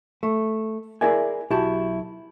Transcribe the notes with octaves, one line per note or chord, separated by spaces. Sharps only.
A3
E4 G#4 A#4 D5 E5 G#5
B1 E4 F#4 G4 A5